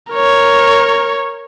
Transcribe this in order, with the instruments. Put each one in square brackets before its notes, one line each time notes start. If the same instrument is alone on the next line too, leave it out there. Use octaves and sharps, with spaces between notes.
[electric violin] A#4 C#5